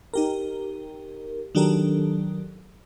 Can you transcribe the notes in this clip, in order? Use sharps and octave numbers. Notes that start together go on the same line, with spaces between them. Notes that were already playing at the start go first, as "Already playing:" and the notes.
D#4 G4 A#4
D#3 F#3 D4 G4 A4 A#4